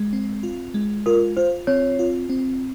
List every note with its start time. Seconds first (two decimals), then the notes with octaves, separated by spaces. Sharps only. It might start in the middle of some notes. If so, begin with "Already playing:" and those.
Already playing: G#3
0.13 C4
0.43 F4
0.74 G#3
1.06 F4 A#4
1.37 F4 C5
1.67 C4 C#5
1.99 F4
2.29 C4